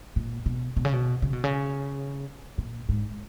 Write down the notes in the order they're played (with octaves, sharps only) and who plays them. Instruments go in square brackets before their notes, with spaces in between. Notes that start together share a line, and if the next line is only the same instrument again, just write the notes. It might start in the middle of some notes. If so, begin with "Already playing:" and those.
[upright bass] A#2
B2
B2
C#3
B2
C#3
B2
C#3
A#2
G#2